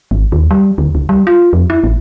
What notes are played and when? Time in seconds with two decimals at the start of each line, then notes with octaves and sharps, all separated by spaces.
0.11 G#1
0.32 D#2
0.51 G3
0.78 D2
0.95 C#2
1.09 G3
1.27 F4
1.53 F2
1.70 E4
1.84 A1